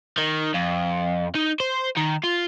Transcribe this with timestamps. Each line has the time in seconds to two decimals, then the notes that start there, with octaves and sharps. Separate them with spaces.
0.18 D#3
0.54 F2
1.35 D#4
1.60 C5
1.97 D#3
2.23 F4